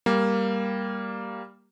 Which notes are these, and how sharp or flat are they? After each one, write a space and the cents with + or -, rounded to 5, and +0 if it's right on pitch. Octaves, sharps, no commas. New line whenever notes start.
G3 +0 A#3 +0